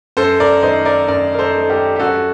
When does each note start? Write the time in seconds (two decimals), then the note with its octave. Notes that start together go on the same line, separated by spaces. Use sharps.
0.17 F#2 A4 C5
0.40 A#4 D5
0.62 D#3 A3 C5 D#5
0.85 A#4 D5
1.08 F#2 A#4 D5
1.34 A#4
1.39 A4 C5
1.55 D#3 A3
1.70 G4 A#4
1.96 G4
2.00 F#2 F#4 A4